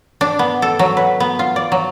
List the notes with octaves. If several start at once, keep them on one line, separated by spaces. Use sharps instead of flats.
D4
B3
A4
F#3
B4
B3
F4
D5
F#3